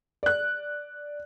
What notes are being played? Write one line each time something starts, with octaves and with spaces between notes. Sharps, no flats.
D5 F#6